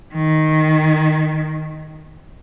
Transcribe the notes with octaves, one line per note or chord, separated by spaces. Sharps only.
D#3